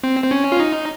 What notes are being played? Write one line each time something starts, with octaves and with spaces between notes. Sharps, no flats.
C4
C4
C#4
F4
D#4